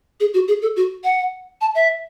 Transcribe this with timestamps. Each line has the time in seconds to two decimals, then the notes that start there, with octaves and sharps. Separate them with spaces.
0.20 G#4
0.34 F#4
0.48 G#4
0.62 A4
0.76 F#4
1.04 F#5
1.61 A5
1.75 E5